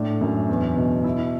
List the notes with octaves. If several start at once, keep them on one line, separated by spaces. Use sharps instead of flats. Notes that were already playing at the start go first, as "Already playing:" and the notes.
Already playing: A2 D4
F#2
E2
B2
E4